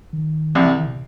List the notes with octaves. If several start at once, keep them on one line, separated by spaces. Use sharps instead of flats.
D#3
C2 C3 F3
E3
D#3
B2